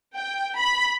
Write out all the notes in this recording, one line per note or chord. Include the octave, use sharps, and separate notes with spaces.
G5
B5